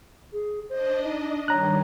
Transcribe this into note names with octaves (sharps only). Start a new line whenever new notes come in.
G#4
D4 C5 D#5
D#4
G2 D#3 G3 C#5 A#5 F#6